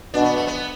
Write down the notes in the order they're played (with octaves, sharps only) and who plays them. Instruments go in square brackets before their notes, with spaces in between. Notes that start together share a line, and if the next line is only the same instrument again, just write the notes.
[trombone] B2 [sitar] D4
[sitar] B3
A3
B3